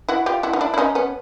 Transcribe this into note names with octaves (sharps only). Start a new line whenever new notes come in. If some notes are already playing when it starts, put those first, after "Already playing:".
E4 F#4
F4 G4
E4 F#4
D#4
D4 E4
E4
C#4 D#4
B3 C#4